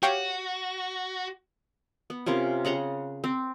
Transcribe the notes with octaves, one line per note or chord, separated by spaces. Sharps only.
F#4 G4 C#5 F5
B3
C3 C#4 F4 A#4
C#3 F#5 A#5 C6
C4